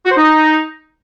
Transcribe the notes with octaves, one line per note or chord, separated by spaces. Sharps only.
F#4
C5
D#4